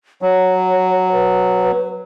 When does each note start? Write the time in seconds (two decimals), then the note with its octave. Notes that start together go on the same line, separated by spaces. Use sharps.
0.22 F#3 C#5
1.12 B4